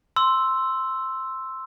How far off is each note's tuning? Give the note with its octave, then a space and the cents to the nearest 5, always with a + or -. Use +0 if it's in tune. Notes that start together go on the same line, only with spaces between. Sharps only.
C6 +0 E6 +0